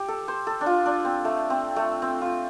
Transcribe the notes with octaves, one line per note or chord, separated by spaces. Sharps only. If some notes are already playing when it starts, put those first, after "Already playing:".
Already playing: G4
A4
C5
A4
D4
F4
D4
C4
A3
C4
A3
C4
F4